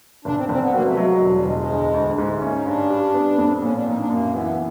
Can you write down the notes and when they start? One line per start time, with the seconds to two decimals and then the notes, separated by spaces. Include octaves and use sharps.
0.25 F1 D4
0.37 C4
0.44 B3
0.49 F1 C4
0.61 B3
0.72 F#3 A#3
0.85 A3
0.97 F#3 G#3
1.09 G#3
1.21 E1 G3
1.33 G3
1.45 E1 G#3
1.58 G#3
1.69 D2
1.94 D2
2.17 G#2 G#3
2.30 A3
2.41 A#3 C#4
2.54 D#4
2.66 G2 D4
2.90 G3
3.14 B3
3.38 F2
3.62 A#2 C#4
3.73 D4
3.86 A#2 D#4
3.98 D4
4.10 F#2 A#3
4.34 E3 B3